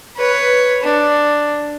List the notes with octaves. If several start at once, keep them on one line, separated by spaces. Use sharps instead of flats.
B4 C#5
D4